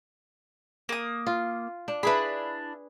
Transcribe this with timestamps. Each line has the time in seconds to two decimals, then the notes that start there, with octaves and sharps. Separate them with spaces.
0.89 A#3 D#6
1.27 F4
1.88 D4
2.03 D4 E4 G#4 B4 B5